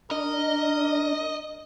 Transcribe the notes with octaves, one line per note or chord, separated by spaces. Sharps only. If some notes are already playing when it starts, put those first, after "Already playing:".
D4 A#4 D#5